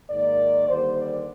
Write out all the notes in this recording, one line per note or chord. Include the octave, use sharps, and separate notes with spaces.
G#2 D#3 A#3 D5
D#2 D3 G3 A#3 C5
D5